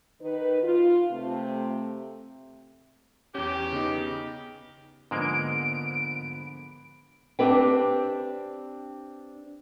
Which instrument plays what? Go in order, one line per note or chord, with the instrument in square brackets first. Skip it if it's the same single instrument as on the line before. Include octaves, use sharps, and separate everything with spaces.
[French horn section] D#3 D#4 B4
F4
C3 A3
[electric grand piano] E2 C#4 [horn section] G4
[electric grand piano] C#3 B3 D#4
[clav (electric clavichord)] G#2 G#3 A#3 [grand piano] D3 F3 B3 [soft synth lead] D7
[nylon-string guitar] C4 D4 G4 B4 E5 G5